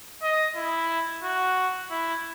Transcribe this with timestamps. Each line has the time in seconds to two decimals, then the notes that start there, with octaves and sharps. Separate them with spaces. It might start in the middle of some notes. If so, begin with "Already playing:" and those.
0.23 D#5
0.56 E4
1.24 F#4
1.91 E4